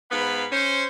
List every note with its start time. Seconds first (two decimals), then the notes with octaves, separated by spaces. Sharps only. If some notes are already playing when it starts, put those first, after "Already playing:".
0.12 G#2 B3 F5 B5
0.52 C#4 C5